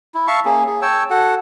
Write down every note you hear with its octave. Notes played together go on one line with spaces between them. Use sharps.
E4
E5 F5 A5 C#6
A#3 C#4 G#4
G#4
C#5 G5 A5 E6
F#4 A4 F#5